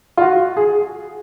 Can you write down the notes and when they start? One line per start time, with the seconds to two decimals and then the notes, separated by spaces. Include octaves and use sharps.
0.17 F4
0.22 F#4
0.57 G#4